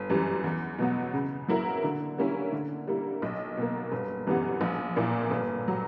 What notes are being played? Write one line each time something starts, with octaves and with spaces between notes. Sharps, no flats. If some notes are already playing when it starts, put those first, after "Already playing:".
Already playing: G1
F#2 E3 G3
E2
B2 F#3 B3
C#3
F#3 A#3 E4 A#4
D3
G3 A#3 C#4 E4
D3
G3 A#3 E4
B1
B2 A#3
G1
F#2 E3 G3 B3
A#1
A#2 A#3 E4
G1
F#3